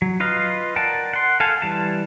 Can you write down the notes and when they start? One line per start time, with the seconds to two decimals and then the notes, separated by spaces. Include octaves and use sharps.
0.02 F#3
0.20 F4 B4 D#5 F5
0.76 A#4 D5 F#5 G5 A5
1.13 F#5 C6
1.40 A4 F5 F#5 G#5 A5
1.62 E3 G3 A5